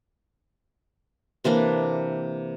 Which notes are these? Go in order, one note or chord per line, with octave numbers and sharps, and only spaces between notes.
C3 E3 A#3 D4